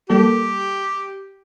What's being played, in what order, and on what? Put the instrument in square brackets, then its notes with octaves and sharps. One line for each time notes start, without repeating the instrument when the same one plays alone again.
[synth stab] G3 A#3 A4 [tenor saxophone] G4